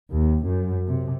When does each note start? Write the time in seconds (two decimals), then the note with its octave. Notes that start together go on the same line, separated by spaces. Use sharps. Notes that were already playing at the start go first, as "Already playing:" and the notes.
0.12 D#2
0.45 F#2
0.87 C3